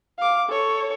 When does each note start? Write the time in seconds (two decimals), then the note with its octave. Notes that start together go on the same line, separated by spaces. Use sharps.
0.18 F5 D6
0.48 A4 C#5